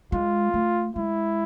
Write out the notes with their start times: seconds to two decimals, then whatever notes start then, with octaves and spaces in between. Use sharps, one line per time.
0.12 G#3 F4
0.54 A3
0.96 G#3 E4